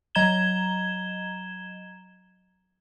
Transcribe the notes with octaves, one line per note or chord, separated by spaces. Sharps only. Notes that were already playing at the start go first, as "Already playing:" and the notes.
F#3 D#5 A#5 G#6 E7 G7